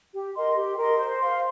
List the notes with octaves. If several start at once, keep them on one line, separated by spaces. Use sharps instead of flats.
G4
A#4 D#5 C6
G4
A#4 D#5 C6
C5
F5 C6